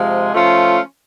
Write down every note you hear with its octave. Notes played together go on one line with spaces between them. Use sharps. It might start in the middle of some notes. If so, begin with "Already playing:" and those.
Already playing: C3 F3 G#3
F3 A3 C#4 F4